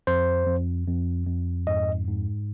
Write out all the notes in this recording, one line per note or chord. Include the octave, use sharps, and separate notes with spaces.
F2 C5
F2
F2
F2
G#2 D#5
G#2